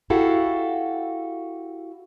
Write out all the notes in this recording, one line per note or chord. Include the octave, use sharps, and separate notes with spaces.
E4 F#4 G4 A4 F5 F#5